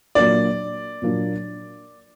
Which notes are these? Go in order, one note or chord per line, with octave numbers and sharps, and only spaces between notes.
A#2 F#3 A#3 D4 D5
A#2 F#3 A#3 D4